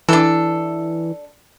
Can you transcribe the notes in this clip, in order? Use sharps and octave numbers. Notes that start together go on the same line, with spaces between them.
E3 D4 A4